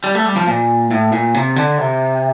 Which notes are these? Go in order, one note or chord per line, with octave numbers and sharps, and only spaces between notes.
G3
A3
G3
F3
A#2
A2
A#2
C3
D3
C3